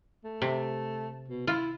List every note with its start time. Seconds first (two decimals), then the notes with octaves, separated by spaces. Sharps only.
0.24 A3
0.42 C3
1.28 B2
1.47 E4 F4